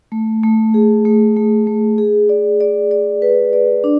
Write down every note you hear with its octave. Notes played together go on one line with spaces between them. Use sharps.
A3
A3
G#4
A3
A3
A3
G#4
D5
D5
D5
B4
D5
D4